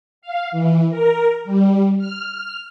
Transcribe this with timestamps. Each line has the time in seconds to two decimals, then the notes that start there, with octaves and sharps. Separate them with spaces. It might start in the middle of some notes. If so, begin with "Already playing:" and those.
0.22 F5
0.52 E3
0.90 A#4
1.45 G3
1.99 F6